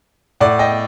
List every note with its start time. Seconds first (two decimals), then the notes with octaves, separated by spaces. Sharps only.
0.40 A2 D5 F#5
0.59 D#5 G5